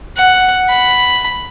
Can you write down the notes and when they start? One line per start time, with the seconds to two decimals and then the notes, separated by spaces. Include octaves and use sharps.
0.17 F#5
0.69 B5